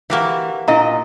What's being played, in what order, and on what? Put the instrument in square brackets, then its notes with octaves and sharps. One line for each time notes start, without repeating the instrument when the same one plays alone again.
[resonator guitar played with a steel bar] E3 [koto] A#3 F#4 G4
[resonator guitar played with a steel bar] A#2 D#5 [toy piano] D4 E4 A#5